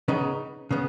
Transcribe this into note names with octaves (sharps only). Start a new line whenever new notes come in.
C#3 B3 D#4
C#3 B3